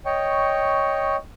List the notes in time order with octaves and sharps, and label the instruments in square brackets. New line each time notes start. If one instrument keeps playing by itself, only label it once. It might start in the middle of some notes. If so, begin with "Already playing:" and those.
[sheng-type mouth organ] C#5 D#5 G5 C#6